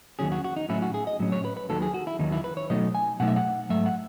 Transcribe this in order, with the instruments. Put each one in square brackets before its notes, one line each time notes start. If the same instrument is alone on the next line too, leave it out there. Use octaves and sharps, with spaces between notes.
[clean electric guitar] D#2 D#3 F#3 C#4 G#4
F#4
F#4
D#4
A2 F#3 C#4 E4
F#4
G#4
D#5
A2 F#3 C#4
C#5
B4
B4
D#2 D#3 F#3 A4
G#4
F#4
E4
D#2 D#3 F#3 D#4
E4
B4
C#5
B2 F#3 A3 D#4 D#5
G#5
B2 F#3 A3 D#4 F#5
E5
F#5
G#2 F#3 A3 E5
F#5